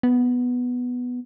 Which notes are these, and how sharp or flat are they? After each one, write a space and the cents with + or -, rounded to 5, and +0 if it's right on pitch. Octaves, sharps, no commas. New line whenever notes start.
B3 +0